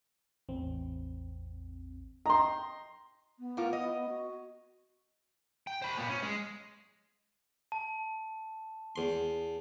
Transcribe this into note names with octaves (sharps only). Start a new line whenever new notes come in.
A1 E2 C4
D#5 G5 A#5 C6
B3
A2 A#3 F4
D#5
F#4
G5
C5 B5
A#2 B3
C#4
G#3
A5
E2 C6